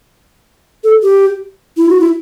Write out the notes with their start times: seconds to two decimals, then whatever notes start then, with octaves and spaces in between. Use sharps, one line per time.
0.84 A4
1.03 G4
1.77 E4
1.89 F#4
2.00 E4